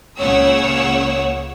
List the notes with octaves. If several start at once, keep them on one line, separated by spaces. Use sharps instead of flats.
C#2 A#2 C#3 C#5 F#5 E6